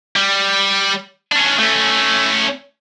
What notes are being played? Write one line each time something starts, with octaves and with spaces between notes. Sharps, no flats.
G3
C#4 D4
A3 C#4